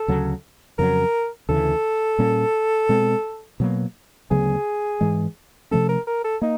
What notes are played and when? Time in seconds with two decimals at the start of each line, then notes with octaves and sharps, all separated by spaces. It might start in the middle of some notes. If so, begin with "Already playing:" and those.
Already playing: A4
0.08 D2 C#3 F#3
0.78 F2 C#3 F#3 A#4
1.49 D2 C#3 E3 A4
2.19 A#2 G3 A#3 C#4
2.89 B2 G#3 C4
3.60 B2 F#3 A#3
4.31 D2 C#3 F#3 B3 G#4
5.01 G#2 E3 G#3
5.71 C3 F3 A3 C#4 A4
5.89 A#4
6.07 A#4
6.24 A4
6.42 A#3 D#4